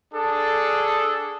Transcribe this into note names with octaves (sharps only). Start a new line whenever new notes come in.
D4 G#4 A4